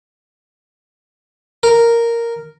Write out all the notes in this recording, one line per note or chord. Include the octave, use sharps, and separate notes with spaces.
A#4